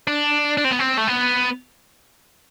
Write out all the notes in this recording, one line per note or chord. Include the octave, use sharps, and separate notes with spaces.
D4
D4
C4
B3
C4
A3
B3